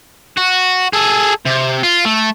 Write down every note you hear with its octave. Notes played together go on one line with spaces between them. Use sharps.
F#4
G#4 A4
C3
F4
A3